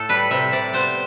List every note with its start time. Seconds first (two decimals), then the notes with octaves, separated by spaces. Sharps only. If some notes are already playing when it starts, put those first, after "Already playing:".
Already playing: A2 A4
0.09 G3 B4
0.31 C3 E5
0.52 C3 D5
0.73 B3 C5